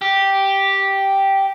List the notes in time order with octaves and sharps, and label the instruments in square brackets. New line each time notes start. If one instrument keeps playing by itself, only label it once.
[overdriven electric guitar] G4